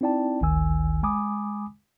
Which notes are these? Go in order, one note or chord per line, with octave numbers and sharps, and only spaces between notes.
C4 D#4 E4 D5 G5 A5
G#1 D2 D#3 G#5 E6
G#3 G#5 B5 D6 D#6